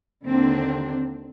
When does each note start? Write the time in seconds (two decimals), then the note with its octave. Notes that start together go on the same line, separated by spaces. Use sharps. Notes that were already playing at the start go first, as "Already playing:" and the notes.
0.24 D#2 D3 A#3 C4 D4